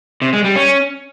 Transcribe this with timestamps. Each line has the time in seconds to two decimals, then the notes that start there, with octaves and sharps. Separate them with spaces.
0.22 C3
0.33 G#3
0.44 G3
0.56 C#4